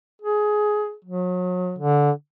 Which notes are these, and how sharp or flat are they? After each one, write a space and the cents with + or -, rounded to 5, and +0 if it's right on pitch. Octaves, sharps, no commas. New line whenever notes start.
G#4 +15
F#3 -35
D3 -15